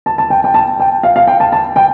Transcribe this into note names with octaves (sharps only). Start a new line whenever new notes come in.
A5
A5
G5
G5
A5
G5
F5
F5
G5
A5
A5
G5